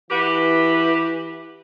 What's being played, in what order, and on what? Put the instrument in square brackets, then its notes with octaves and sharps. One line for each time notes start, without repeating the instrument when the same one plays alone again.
[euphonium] E3 [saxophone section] F#4 G4 B4